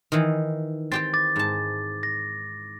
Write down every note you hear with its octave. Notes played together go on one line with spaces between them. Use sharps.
D#3 E3
C4 G4 G5 A6
D6 A6
G#2 A5
A#6